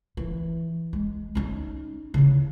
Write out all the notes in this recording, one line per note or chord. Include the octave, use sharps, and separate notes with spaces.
E3
G#3
C#4 D#4
C#3 E4